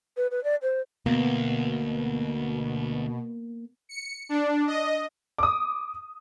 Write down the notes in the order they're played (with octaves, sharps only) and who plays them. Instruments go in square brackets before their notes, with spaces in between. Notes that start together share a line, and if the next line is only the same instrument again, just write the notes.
[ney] B4
B4
D5
C5
[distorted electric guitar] D2 [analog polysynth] B2 [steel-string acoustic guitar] A#3 [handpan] B3
[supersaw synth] C#7
D4
D#5
[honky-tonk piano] D6 D#6